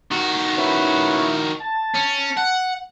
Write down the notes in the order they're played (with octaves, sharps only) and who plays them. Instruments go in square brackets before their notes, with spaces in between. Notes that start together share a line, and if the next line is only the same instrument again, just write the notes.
[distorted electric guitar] D#3 F#4
[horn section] C#4 E4 B4
A5
[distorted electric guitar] C#4
F#5